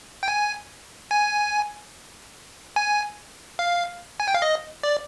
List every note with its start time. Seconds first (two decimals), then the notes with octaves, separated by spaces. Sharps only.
0.23 G5
0.28 G#5
1.11 G#5
2.76 G#5
3.59 F5
4.20 G#5
4.28 G5
4.34 F5
4.42 D#5
4.83 D5